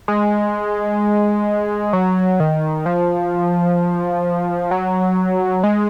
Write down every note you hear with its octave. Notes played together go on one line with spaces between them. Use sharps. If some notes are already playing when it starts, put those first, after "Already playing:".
G#3
F#3
D#3
F3
F#3
G#3